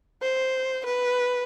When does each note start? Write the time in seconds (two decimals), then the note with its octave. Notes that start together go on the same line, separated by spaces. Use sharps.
0.22 C5
0.85 B4